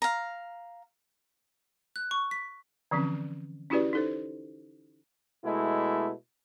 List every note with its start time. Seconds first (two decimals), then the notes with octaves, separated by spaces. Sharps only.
0.02 F5 A#5
1.96 F#6
2.11 C#6
2.31 B6
2.91 D3 E3 F3 C4 C#4
3.70 C#4 E4 F#4 G4 B4 D5
3.93 D#4 A4 C5
5.45 B2 G#3 A3 E4